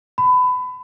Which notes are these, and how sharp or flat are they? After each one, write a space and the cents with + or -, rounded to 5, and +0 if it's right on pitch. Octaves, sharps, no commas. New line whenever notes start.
B5 +25